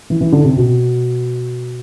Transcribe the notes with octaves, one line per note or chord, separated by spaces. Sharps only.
E3
E3
D3
C3
B2